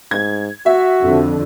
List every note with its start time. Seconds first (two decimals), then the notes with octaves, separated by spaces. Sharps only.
0.11 G#2 G#6
0.66 F#4 E5
1.00 F2 D3